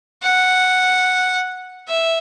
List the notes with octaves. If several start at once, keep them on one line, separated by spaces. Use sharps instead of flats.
F#5
E5